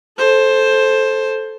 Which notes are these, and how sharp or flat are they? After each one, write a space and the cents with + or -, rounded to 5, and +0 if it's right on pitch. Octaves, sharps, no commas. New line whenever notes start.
A4 -10 C5 +10